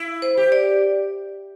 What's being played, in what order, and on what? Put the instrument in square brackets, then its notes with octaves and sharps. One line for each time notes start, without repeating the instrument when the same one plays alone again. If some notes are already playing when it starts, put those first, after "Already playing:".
Already playing: [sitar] E4
[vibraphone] C5
[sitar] G4
[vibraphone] D5